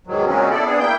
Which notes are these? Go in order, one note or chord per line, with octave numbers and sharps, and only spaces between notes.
E2 G#2 D#3 F#3
A#2 C#3 F#3 G#3 C4 C#4
B3 E4 A4 D5
B3 C4 D4 G#4
A#3 E4 G5 G6